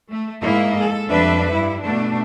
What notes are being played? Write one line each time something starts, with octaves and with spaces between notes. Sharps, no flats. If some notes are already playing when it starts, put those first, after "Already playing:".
A3
G#2 A#3 E4 D#5
A4
F2 G3 D4 B4 E5
G2 E4
B2 A3 D4